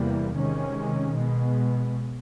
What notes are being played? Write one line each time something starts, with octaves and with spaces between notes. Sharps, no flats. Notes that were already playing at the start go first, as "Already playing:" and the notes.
Already playing: E2 C3 E3 G3 A#3
C3 D#3 G#3 C#4
B2 G#3 B3